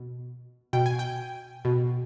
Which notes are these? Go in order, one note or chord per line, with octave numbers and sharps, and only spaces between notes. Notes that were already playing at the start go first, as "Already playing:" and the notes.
Already playing: B2
B2 G5
G#5
G5
B2